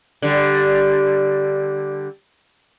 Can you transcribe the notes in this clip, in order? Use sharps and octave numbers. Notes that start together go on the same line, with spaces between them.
D3 G3